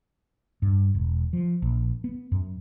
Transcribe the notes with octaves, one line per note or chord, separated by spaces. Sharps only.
G2
E1
F3
A#1
B3
F#2